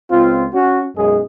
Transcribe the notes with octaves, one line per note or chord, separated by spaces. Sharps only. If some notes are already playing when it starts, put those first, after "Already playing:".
C#2 C4 F4
C#4 F#4
B1 F#2 G#3 G#4